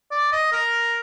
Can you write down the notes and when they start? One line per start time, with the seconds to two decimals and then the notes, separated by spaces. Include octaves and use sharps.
0.11 D5
0.32 D#5
0.52 A#4